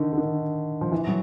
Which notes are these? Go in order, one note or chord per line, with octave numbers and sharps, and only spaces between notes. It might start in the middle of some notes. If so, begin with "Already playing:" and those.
Already playing: D3 D#3
D3
D#3
F3
E3
F#3